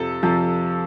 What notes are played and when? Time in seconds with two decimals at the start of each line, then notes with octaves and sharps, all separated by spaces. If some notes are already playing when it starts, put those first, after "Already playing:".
Already playing: F2 C3 F3 A4
0.23 F2 C3 F3